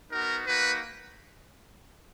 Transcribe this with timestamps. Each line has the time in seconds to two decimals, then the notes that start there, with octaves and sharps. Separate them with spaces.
0.11 B3 D#4 F#4 A#4
0.47 A#3 D#4 F#4 B4